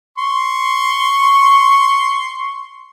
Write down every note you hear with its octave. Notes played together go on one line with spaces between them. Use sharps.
C6 C#6